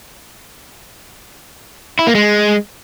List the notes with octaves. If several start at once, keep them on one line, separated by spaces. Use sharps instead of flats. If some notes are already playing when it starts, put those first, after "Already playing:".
E4
A#3
G#3